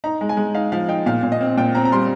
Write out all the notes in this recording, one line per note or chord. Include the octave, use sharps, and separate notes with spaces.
D#4 A#5
G#3
G#5
G#3
D#4 F5
F3 F5
D#4 G5
A#2 F5
A#2
D#5
C4
A#2 G5
C4 A#5
A#5
G3 C6